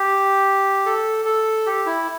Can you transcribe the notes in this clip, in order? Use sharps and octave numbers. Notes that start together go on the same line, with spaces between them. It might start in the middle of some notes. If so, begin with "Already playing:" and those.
Already playing: G4
A4
A4
G4
E4